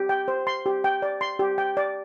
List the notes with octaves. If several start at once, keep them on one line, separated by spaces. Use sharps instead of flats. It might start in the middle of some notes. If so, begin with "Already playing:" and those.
Already playing: G4
G5
C5
C6
G4
G5
D5
C6
G4
G5
D5